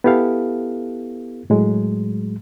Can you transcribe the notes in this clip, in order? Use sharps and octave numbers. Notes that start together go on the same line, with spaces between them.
B3 E4 G4 A4 F5
A2 F#3 G#3